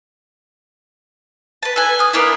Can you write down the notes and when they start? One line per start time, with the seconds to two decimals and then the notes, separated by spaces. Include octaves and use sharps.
1.63 B4 A5
1.76 A4 B4 G#5
1.99 F5 D#6
2.13 A#3 B3 D4 E4